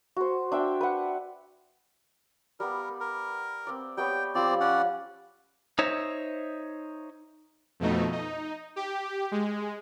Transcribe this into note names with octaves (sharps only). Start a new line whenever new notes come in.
F#4 C5
D4 E5 G5
B4 F#5
G3 B3 A#4
A#4
C4 D5
G3 B3 C#5 G5
F3 G3 C4 D5
C#4 D5 F#5
D#4 C5 C#5 E5
F2 B2 A3 D#4
D#4
G4
G#3